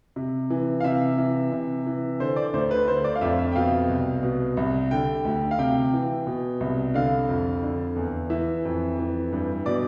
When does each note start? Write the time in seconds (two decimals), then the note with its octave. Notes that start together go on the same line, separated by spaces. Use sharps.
0.16 C3
0.50 E3
0.80 F5
0.84 C3 E5
1.18 E3
1.52 C3
1.87 E3
2.20 D3 C5
2.36 D5
2.54 D2 C5
2.71 B4
2.88 D3 C5
3.04 D5
3.16 F5
3.21 F2 E5
3.39 E5
3.52 G5
3.55 B2 F5
3.89 C2
4.23 B2
4.57 C2
4.91 D3 G5
5.25 D2
5.51 F5
5.59 C3 G5
5.93 E3
6.27 B2
6.60 C2
6.94 D3 F5
7.29 F2
7.63 D3
7.96 E2
8.30 E3 E5
8.65 F2
8.99 E3
9.32 G2
9.66 B2 D5